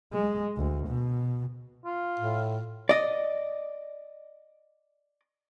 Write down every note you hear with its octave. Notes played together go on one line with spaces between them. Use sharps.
G#3
D2
B2
F4
A2
D5 D#5